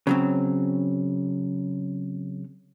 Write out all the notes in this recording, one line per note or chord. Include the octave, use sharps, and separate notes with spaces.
C#3 F#3 C4